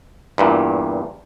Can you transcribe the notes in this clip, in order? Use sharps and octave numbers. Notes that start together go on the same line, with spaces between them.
E2 G2 A#2